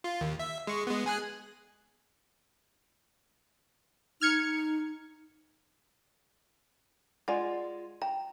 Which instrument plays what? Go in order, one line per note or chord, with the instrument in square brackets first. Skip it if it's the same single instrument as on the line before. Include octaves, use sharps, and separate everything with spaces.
[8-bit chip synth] F4
D#2
E5
G#3 C#6
G#3 B3
G#4 G#5 F#6
[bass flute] D#4 [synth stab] F6 G#6 C#7
[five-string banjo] G#3 F4 D5 [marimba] F#5 G#5
[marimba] G5 [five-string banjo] A#5